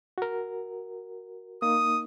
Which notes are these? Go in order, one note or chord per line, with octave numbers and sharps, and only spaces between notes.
F#4 A#4
A#3 D#4 D#6